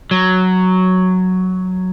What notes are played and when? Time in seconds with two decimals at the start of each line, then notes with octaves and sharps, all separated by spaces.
0.11 F#3